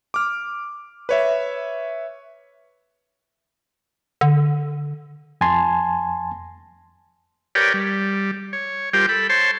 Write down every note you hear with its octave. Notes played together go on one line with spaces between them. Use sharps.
D6 F6
B4 C#5 E5
D3
F2 G#5 A5 C6
G4 A#4 B4 C#5 D5 G5
G3
C#5
G3 F4 G4 A#4 C5 G5
A4 B5
C5 C#5 A5 C6